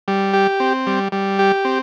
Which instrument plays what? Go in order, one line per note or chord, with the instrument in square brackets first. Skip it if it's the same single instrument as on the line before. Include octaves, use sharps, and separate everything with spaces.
[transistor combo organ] G3
G4
C4
G3
G3
G4
C4